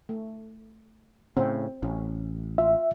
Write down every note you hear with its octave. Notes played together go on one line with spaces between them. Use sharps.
A3
A2 C#3 C4
A1 C#4
F4 E5